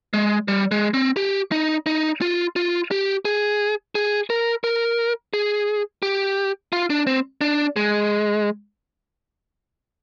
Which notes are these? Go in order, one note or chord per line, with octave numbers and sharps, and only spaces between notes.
G#3
G3
G#3
C4
G4
D#4
D#4
F4
F4
G4
G#4
G#4
A#4
A#4
G#4
G4
F4
D4
C4
D4
G#3